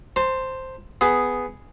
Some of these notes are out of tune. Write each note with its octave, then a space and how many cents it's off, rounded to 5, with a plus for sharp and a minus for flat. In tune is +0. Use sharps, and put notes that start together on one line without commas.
C5 +0 A5 +30
B3 +5 G#4 +0